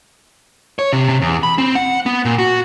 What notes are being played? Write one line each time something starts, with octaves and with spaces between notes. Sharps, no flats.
C#5
C3
C3
E2
B5
C4
F#5
B3
A#2
F#4